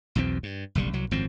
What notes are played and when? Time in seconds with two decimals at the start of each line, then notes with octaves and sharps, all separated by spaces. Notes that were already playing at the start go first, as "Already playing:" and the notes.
0.15 B1 E2 B2 C4
0.43 G2
0.75 F#1 B1 D3 G3
0.94 C2 F#3
1.11 G#1 F#2 F3 C4